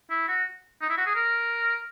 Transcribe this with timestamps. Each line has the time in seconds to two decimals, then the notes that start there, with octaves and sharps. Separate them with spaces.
0.10 E4
0.28 F#4
0.81 D#4
0.90 E4
0.97 F#4
1.06 G#4
1.15 A#4